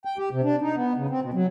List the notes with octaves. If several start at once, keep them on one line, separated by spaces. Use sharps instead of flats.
G5
G4
C3
D4
D#4
B3
C#3
C4
B2
F#3